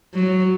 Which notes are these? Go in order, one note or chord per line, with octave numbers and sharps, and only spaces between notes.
F#3